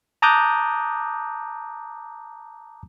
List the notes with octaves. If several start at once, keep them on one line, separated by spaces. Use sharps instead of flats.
A5 A#5 D6 D#6 F#6 G6